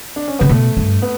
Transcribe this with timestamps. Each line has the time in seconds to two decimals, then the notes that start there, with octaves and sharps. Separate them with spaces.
0.16 D4
0.28 C#4
0.39 C#3 B3
0.49 B2 A3
0.77 G2
1.02 B3